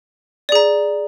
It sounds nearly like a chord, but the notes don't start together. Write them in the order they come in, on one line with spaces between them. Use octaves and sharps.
D5 G#4 A#5